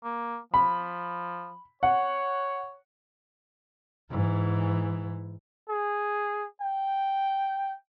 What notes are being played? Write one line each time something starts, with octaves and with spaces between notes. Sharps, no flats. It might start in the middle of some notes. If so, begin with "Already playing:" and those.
A#3
F3 B5
C#5 F#5
G#2 E3
G#4
G5